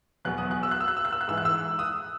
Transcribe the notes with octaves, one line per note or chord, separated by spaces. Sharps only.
E2 B2 F#3 F#6
D#6
F#6
E6
F#6
E6
F#6
E6
F#6
E6
F#6
G#2 E3 E6
F#6
E6
D#6